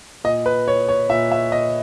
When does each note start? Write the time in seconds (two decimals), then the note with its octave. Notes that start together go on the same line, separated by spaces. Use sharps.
0.24 A#2 D#5
0.46 B4
0.68 C#5
0.89 C#5
1.09 A#2 E5
1.32 E5
1.52 D#5